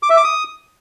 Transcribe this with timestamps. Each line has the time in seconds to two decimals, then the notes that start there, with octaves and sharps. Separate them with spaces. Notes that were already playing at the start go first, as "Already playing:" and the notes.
0.03 D6
0.10 E5
0.17 D6
0.24 D#6